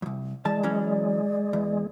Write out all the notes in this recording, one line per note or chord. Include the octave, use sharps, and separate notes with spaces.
C2 F2
E3 G#3 D5 A5
E3 F#3 C#4
E2